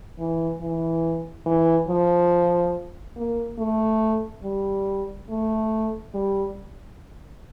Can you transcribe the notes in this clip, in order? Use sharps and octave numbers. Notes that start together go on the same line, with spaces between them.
E3
E3
E3
F3
A#3
A3
G3
A3
G3